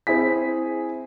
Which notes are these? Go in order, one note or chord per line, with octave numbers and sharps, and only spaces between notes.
C4 E4 G#4 B6